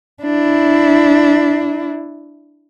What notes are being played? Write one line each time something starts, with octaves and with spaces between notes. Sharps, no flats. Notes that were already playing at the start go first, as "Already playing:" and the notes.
D4 E4